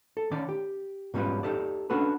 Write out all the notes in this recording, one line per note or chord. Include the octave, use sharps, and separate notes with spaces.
A4
D#3 C#4 D5
G4
G#2 B2 G3 C#4 F4 B4
D#4 G4 A4 D5
C#4 D4 F#4 A4 B4